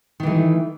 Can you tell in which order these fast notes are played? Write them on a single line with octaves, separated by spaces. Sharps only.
D#3 E3 A3